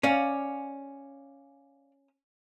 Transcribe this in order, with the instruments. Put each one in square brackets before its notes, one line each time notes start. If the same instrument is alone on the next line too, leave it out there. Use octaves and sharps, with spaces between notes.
[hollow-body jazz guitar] C#4 [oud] D5 F5